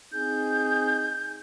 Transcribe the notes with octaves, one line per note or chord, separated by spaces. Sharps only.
C4 D#4 G#4 G6